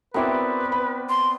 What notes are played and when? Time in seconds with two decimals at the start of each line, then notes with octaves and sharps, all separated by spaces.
0.14 B3 C4 E4 F#4 A#4 B4 D5
0.72 B5
1.09 C6